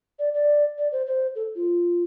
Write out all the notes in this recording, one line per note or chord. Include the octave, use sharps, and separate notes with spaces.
D5
D5
D5
C5
C5
A4
F4